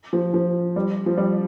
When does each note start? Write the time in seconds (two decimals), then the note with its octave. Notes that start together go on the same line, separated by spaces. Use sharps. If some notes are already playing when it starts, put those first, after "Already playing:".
0.13 F3
0.34 F3
0.76 G3
1.06 F3
1.18 G3